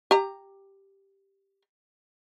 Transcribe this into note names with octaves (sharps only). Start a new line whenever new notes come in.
G4 A#5